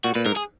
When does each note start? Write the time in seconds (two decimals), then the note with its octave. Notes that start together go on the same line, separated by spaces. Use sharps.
0.04 A#2 F#4
0.15 A#2 B4
0.26 G#2 A#4
0.36 G#4